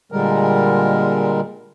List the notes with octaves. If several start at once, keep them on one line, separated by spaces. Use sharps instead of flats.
A#2 D3 G3 G#3 A#4